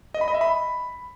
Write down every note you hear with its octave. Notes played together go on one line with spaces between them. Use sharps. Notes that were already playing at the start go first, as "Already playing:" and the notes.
D#5
B5
D#5
E5
B5